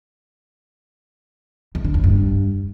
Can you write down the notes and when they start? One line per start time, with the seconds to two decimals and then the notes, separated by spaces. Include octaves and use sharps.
1.75 E2
1.85 D3
1.94 E2
2.04 G2